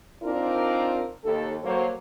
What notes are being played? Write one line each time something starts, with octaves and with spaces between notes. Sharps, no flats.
C4 D4 D#4 F4 A#4 D5
D#2 A4
F#3 A#3 F#4 A4 C5 C#5